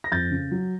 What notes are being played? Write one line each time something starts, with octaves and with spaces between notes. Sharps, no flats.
A#6
F2 G6 A6
C#3
F#3